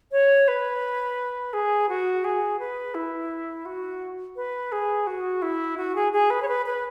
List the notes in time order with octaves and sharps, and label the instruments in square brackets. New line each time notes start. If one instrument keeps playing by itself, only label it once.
[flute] C#5
B4
G#4
F#4
G#4
B4
E4
F#4
B4
G#4
F#4
E4
F#4
G#4
G#4
B4
C#5
B4
B4